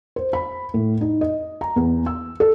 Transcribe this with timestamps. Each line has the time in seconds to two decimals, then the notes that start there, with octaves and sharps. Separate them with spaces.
0.16 C5
0.33 B5
0.74 A2
1.01 D#4
1.21 D#5
1.61 A#5
1.76 E2
2.06 E6
2.40 A4